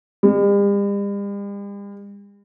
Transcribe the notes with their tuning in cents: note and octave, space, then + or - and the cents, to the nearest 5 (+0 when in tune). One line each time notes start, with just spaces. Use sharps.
G3 +45